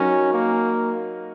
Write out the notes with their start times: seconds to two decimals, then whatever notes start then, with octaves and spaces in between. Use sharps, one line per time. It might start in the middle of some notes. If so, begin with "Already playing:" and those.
Already playing: F#3 C#4 D#4 F#4 A#4 C#5
0.33 A#3